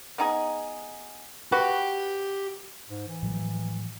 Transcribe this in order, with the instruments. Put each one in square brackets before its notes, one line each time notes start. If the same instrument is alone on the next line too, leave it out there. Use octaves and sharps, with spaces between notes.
[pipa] B3 D#4 G#4
[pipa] F#4 B4 [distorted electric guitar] G4
[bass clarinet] G#2
E3
[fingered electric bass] A2 F3 F#3